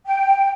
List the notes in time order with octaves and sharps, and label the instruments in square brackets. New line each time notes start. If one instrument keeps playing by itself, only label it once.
[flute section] G5